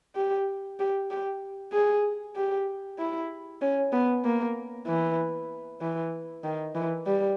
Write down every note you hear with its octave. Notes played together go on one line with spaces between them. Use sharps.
G4
G4
G4
G#4
G4
E4
C#4
B3
A#3
E3
E3
D#3
E3
G3